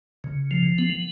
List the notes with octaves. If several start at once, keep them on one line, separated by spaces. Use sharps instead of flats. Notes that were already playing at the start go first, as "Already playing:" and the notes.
C#3
F3
B3